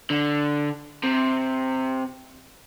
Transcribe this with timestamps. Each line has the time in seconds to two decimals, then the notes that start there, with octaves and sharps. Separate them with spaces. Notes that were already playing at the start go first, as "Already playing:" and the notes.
0.10 D3
1.03 C3